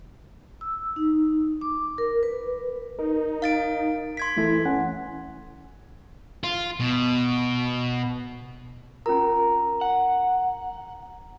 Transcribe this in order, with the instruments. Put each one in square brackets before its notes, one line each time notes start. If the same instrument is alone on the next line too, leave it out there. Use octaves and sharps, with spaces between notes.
[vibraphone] E6
D#4
D6
A#4
B4
[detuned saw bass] D#4 [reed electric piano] A#4
[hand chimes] F5 A6 D7
C6 G#6 B6
[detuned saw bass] E3 [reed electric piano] A3 E4 A4
[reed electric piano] C#4 F#5 G#5
[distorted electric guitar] F4
B2
[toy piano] C#4 F4 A#4 [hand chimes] A#5
[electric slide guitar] F#5